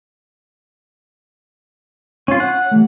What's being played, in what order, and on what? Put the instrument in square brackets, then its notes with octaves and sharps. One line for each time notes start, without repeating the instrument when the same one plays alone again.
[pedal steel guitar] C#4 F4 [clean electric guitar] C#5
[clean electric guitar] C#5 [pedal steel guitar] F#5
[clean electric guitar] E3 G3 A3